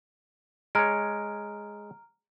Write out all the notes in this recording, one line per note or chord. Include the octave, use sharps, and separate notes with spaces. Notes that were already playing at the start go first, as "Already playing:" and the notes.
G#3 C#5 A#5 F6 D7